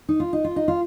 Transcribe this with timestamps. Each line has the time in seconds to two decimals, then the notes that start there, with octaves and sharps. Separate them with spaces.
0.09 D#4
0.20 F4
0.33 D#4
0.44 F4
0.56 D#4
0.68 F4